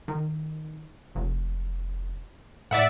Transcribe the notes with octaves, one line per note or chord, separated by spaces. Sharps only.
D#3
F1
A2 D5 E5 F#5